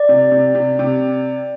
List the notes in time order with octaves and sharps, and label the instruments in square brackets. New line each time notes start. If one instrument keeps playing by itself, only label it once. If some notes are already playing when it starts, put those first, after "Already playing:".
Already playing: [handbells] D5
[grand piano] C3
C3
C3
C3